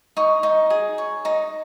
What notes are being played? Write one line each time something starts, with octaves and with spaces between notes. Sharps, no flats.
D#4 C#6
D#4
G#4
C#5
D#4 A#5